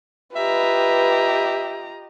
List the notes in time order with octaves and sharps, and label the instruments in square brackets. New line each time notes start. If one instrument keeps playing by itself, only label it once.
[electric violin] F4 A#5 [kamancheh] G4 D#5 [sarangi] B4 [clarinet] E5